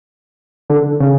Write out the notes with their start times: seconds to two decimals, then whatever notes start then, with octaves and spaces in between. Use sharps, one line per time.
0.70 D3
1.00 C#3